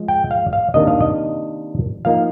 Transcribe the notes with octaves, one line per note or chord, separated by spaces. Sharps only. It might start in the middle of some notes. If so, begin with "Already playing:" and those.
Already playing: F3 G#3
G5
F5
F5
C3 D#3 A#3 D4 D#5
F5
D#5
F3 A#3 D#4 F5